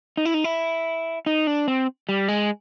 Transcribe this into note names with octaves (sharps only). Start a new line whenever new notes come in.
D#4
E4
D#4
E4
D#4
D4
C4
G3
G#3